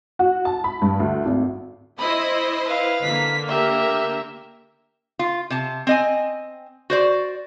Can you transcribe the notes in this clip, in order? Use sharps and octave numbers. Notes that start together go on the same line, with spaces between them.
F#4
A5
B5
G2
D2
G#1
E4 C5 D#5 B5
B4 F5
D3 A#3 B6
G4 A#4 E5
F4
C3 A5
C4 D#5 G#5
F#4 C5 D5